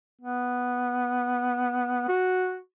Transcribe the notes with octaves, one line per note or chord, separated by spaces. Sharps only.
B3
F#4